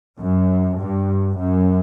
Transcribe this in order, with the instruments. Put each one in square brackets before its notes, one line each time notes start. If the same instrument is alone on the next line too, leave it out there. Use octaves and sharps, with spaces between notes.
[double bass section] F#2
G2
F#2